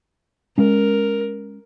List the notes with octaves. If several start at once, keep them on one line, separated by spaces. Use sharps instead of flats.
G#3 C#4 A#4